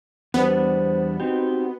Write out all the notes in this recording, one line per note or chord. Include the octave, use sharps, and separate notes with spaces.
E2 G3 B3 D4 C5
C4 D#4 F#4 G4